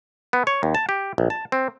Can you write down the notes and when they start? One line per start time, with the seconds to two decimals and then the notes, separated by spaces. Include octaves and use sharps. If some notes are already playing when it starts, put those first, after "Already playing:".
0.33 B3
0.47 C#5
0.63 D#2
0.75 A5
0.89 G4
1.18 A#1
1.30 A5
1.52 C4